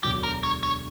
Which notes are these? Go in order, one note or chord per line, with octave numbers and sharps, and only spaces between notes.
E1 D2 D3 F#3 G4
A#4
C#5
C#5